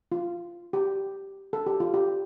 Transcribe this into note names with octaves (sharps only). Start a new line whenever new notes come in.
F4
G4
A4
G4
F4
G4